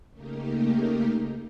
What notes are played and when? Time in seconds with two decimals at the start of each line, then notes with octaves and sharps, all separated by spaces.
0.10 C#3 A3 A#3 D#4 G4 A#4